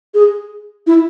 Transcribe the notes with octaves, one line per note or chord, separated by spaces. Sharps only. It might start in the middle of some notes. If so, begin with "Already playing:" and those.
G#4
E4